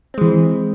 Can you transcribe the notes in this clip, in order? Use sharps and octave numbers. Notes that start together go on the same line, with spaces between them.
E3 G#3 C4